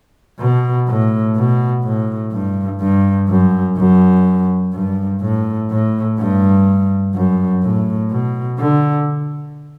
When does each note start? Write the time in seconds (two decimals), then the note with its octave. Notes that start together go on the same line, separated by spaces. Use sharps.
0.39 B2
0.87 A2
1.36 B2
1.84 A2
2.32 G2
2.80 G2
3.29 F#2
3.77 F#2
4.73 G2
5.21 A2
5.70 A2
6.18 G2
7.14 F#2
7.62 A2
8.11 B2
8.59 D3